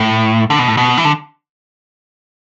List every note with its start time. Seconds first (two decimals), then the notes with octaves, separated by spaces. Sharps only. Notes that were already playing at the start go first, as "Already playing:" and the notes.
Already playing: A2
0.50 D3
0.59 B2
0.68 A2
0.77 B2
0.98 E3
1.05 D3